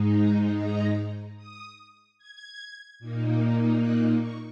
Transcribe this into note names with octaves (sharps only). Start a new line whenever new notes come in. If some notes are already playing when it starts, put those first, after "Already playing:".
Already playing: G#2 G#3 D#4
A#5
A#5
D#6
G#6
A#2 A#3 D#4
F#6
C#6